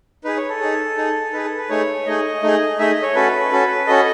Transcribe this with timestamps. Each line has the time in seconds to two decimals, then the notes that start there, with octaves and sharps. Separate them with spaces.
0.24 D#4 G#4 B4
0.37 C#5
0.49 A4
0.61 D#4 G#4
0.97 D#4 G#4
1.33 D#4 G#4 B4
1.45 A4
1.57 B4
1.69 A3 D#4 G#4 C#5
2.06 A3 D#4 G#4 D#5
2.43 A3 D#4 G#4
2.79 A3 D#4 G#4 E5
2.91 D#5
3.02 C#5
3.15 C#4 F#4 A4 B4
3.51 C#4 F#4 A4
3.87 C#4 F#4 A4 D#5